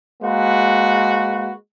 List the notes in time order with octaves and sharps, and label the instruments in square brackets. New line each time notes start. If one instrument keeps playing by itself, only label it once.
[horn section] G#3 A#3 F#4 B4